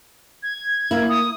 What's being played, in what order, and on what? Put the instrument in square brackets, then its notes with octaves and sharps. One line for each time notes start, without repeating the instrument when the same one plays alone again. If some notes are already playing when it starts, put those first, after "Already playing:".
[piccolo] G#6
[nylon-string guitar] A#3 E4
[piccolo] D#6